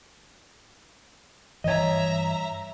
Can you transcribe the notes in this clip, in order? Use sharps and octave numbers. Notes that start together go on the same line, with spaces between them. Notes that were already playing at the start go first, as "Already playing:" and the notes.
G2 E3 C#5 D#5 E5 A#5